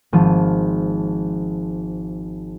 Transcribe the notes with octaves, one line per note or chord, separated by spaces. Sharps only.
G#1 F3 D#7